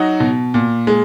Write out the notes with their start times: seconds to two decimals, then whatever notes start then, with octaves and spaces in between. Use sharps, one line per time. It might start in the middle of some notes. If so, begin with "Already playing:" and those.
Already playing: F#3 D#4 F#4
0.20 B2
0.54 A#2
0.87 G#3